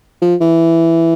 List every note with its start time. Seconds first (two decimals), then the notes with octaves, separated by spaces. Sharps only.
0.22 F3
0.41 E3